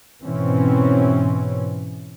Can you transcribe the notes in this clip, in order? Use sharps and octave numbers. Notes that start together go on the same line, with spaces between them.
G#2 B2 E3 C4 C#4